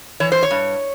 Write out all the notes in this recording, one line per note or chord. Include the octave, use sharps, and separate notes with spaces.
E3 C#5
C5
C#5
G2